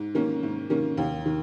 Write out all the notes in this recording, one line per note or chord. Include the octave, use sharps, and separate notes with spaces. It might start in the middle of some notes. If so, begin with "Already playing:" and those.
Already playing: G#2
D#3 A#3 C#4
G#2
D#3 A#3 C#4
D#2
D#3